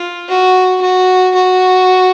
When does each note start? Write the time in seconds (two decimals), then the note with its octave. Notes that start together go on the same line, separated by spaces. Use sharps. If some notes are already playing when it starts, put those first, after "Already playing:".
Already playing: F4
0.29 F#4
0.82 F#4
1.35 F#4